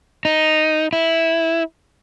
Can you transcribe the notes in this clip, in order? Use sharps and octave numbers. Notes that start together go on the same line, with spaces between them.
D#4
E4